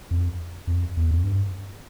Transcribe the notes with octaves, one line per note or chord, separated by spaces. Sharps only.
F2
F2
E2
F2
G2